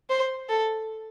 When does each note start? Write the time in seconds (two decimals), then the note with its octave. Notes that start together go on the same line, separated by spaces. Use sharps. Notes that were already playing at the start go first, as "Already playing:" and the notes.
0.10 C5
0.49 A4